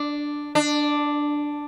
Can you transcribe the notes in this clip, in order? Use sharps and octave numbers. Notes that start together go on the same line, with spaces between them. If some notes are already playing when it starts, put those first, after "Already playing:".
Already playing: D4
D4